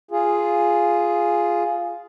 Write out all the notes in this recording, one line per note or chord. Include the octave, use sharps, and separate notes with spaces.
F4 G#4